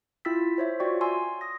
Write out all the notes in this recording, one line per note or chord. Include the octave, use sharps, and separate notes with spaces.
E4 F4 G5 E6 A6 B6
C5 C#5 E5
F4 F#4 C#5 D5 G5 C#6
G#5 C6 E6
D#6 A#6